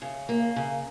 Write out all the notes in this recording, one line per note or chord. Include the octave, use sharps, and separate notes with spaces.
C#3
A#3
C#3